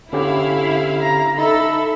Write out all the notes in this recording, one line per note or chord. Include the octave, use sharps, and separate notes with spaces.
D3 C#4 E4 G4 F5
A#5
D#4 A4 E5 B5